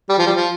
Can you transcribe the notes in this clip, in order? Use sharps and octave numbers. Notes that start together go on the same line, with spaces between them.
G3
F3
G3
F3